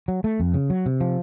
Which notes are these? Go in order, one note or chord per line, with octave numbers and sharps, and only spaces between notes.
F#3
A3
F2
C#3
F#3
C3
F3